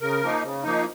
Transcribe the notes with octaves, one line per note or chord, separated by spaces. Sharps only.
C#3 A#4
F3 A#3 D#4
C#3
F3 A#3 D#4